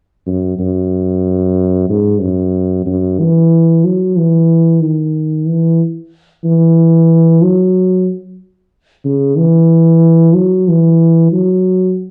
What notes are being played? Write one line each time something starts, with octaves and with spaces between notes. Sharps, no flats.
F#2
F#2
G#2
F#2
F#2
E3
F#3
E3
D#3
E3
E3
F#3
C#3
E3
F#3
E3
F#3